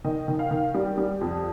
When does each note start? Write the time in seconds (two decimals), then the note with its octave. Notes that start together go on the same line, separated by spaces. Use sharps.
0.05 D#3 D#5
0.28 D#3
0.39 F5
0.51 D#3
0.74 G3
0.98 G3
1.21 F2